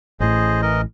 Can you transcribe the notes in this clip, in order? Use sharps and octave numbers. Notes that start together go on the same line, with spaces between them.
A1 A2 G#4 C5 D#5
E3 A#4 D#5